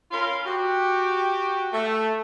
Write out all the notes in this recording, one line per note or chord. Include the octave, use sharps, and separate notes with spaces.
C#4 F4 A#4 F5 B5 C6
F#4 G4
A3